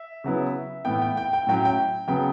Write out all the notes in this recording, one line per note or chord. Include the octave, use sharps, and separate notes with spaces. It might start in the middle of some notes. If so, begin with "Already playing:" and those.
Already playing: E5
C#3 F#3 B3 E4
A2 E3 B3 G5
G5
G5
G5
A2 F#3 C#4 G5
G5
C#3 F#3 B3 G5